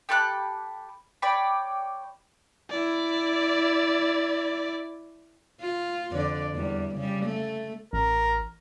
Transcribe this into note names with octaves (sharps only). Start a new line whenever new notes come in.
G4 A4 B5 F#6
C#5 D5 G5 B5
E4 D5
F4
F2 D3 D5
E2 G3
C#3 G3
A3
A1 A#4